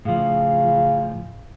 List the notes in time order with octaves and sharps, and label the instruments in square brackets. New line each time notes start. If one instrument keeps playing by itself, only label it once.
[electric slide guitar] A2 F3 [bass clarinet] C#3